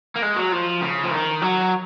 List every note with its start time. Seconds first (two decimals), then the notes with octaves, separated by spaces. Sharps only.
0.16 A#3
0.22 G#3
0.36 F#3
0.52 F3
0.82 C#3
1.04 F3
1.11 D#3
1.42 F#3